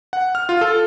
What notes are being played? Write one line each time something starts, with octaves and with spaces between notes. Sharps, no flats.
F#5
F6
F4
A4